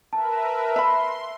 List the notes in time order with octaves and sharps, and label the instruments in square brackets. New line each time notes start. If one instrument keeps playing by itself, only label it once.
[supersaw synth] A#4 B4 E5 [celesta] A5
[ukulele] E5 B5 [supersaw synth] C6